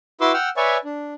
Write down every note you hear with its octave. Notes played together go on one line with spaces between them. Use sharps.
E4 F#4 B4 C6 D6 E6
F#5 G5 E6 F6
B4 C#5 D5 E5 G#5 C#6
D4